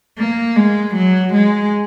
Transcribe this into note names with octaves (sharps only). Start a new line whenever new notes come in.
A#3
G#3
F#3
G#3